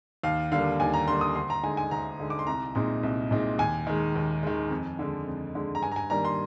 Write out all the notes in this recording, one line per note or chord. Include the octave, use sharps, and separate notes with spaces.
D#2 F5
D3 G3 A#3 F5
D#2 G#5
A#5
D3 G3 A#3 C6
D#6
D2 C6
A#5
D3 G#3 D#4 G#5
G#5
D2 A#5
D3 G#3 D#4
D6
C6
C2 A#5
A#2 G#3 C4 D#4
C2
A#2 G#3 C4 D#4
D#2 G#5
D#3 G#3
D#2
D#3 G#3
F2
D3 G#3
F2
D3 G#3
A#5
G2 G#5
A#5
G#5
D#3 G3 A#3 D4 A#5
C6